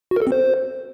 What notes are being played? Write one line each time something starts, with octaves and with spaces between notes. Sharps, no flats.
F#4
A#4
A4
C4
C5